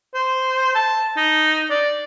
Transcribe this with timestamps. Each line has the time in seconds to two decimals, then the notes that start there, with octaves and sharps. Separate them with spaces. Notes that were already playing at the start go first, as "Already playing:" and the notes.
0.14 C5
0.75 A5
1.17 D#4
1.70 D5